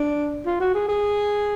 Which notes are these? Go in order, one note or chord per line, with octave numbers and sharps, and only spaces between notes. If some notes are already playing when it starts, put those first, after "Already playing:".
Already playing: D4
F4
F#4
G#4
G#4